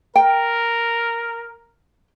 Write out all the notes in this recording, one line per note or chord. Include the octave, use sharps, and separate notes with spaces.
A#4 G5